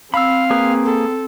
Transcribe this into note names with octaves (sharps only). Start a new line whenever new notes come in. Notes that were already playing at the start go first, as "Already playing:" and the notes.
C4 F5 B5 E6
A#3 G#4 B4
A4